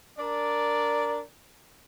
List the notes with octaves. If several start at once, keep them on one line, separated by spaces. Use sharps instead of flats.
D4 A#4 D5